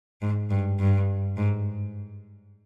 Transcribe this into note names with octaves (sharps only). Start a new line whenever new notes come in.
G#2
G2
G2
G#2